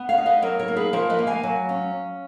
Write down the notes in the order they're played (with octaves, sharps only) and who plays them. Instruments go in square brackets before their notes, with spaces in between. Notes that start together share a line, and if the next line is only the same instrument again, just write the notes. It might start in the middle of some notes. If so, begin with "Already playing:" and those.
Already playing: [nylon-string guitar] B3
C#5 F5
D#4
B4 D#5
F#3 A#4 C#5
A#4 C#5
A#3
G#4 B4
F3 A#4 C#5
B4 D#5
A#3
F5 G#5
F#3
C#4